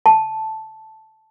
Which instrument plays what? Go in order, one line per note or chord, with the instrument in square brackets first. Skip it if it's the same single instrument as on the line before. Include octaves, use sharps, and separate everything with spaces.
[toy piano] A5